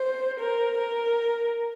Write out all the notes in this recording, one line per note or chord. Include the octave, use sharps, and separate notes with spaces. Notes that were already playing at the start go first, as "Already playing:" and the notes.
Already playing: C5
A#4
A#4